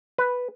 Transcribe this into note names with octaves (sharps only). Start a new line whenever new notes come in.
B4